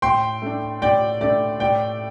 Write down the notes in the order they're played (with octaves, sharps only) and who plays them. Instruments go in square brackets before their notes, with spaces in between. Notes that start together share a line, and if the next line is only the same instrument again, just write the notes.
[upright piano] A2 [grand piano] G5 C6
[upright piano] A3 D4
[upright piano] A2 [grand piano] D5 G5
[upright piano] A3 D4 [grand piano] D5
[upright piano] A2 [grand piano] D5 G5